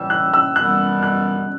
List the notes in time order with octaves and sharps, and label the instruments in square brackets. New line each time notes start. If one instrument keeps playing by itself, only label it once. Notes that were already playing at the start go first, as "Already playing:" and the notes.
Already playing: [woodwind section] A2 E3 G3 [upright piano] E6
[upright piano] F#6
E6
[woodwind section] F#2 E3 G3 B3 [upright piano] F#6
[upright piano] F#6